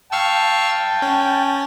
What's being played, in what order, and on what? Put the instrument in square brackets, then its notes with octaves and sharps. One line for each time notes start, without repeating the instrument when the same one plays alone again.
[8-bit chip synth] F5 C#6 E6 [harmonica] G5 A5
[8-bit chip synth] C#4